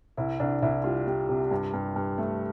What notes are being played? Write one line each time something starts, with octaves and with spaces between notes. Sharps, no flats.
C2 E4
C2 D4
C2 E4
G3 F4
G3
C3
G2
G2
G2
A3